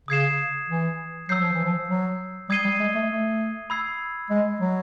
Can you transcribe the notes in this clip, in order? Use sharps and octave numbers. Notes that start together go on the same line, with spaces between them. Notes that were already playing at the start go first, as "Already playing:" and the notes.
C#3 D#6 G#6 C7 E7
E3
F#3 E6 G6 C7
F3
E3
F3
F#3
G3 D#6 G#6 C7 D#7 G7
G3
G#3
A3
A3
B5 E6 G#6 C7
G#3
F#3